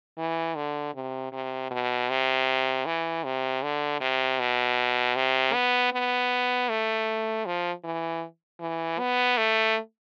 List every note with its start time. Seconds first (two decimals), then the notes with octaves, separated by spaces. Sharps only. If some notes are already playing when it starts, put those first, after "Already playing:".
0.18 E3
0.56 D3
0.95 C3
1.32 C3
1.71 B2
2.09 C3
2.86 E3
3.24 C3
3.63 D3
4.00 C3
4.40 B2
5.16 C3
5.54 B3
5.92 B3
6.69 A3
7.46 F3
7.84 E3
8.61 E3
8.99 B3
9.37 A3